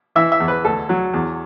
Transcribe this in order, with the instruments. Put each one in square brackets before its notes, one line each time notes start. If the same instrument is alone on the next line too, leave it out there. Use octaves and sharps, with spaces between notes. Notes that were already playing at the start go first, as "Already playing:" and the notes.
[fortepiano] E3 E5
E5
E2
B4
D2 A4
F#3
E2